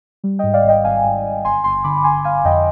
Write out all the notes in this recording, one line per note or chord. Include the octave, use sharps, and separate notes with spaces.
G3
G#2 D#5 G5
D5 F5
G#1
D#5 G5
G#1 F5 G#5
G#2
G#1
G1 G#5 C6
G1 G#5 C6
D3 B5 D6
D3 G#5 C6
G1 F5 G#5
F2 D#5 G5